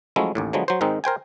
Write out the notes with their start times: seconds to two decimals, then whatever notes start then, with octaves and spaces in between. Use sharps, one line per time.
0.16 F3 F#3 G#3 A3 C#4 E4
0.35 A1 D#2 A2
0.53 D3 F3 F#3 G#3 B3
0.68 F#3 C5
0.81 G#2 D#3 G#3 C4 D#4
1.04 A#4 C5 G5 G#5